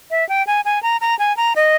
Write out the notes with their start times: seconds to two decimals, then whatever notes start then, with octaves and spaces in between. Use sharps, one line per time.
0.11 E5
0.29 G5
0.47 G#5
0.65 G#5
0.83 A#5
1.01 A#5
1.19 G#5
1.37 A#5
1.56 D#5